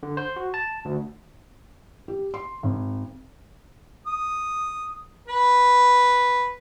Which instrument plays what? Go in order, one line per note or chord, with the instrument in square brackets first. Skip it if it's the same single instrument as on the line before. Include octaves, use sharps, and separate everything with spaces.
[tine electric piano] D3
C5
F#4
A5
D2
[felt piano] G4
C6
G#1
[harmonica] D#6
B4